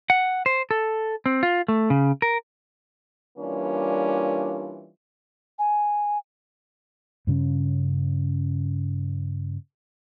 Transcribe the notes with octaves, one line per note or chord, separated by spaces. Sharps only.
F#5
C5
A4
C4
F4
A3
C#3
A#4
E3 G3 A#3 C#4 D4 F4
G#5
G2 C#3 C4 C#4